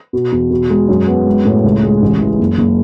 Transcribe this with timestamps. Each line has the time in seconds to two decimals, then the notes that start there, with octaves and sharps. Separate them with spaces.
0.13 B2
0.32 E2
0.51 B2
0.70 G#3
0.88 F#2
1.07 B3
1.26 G#3
1.45 A2
1.64 C#2
1.83 G#3
2.02 A1
2.21 E3
2.39 F#1
2.58 F#1